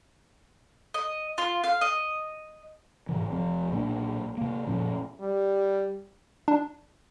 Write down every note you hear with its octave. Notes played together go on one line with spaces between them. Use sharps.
D#5
F4
F5
D#5
G#2 C3 E3
F1 F3 C4
B1 A#2 A#3 D4
C3 A#3
F#1 A#2 F3 C#4
G3
D4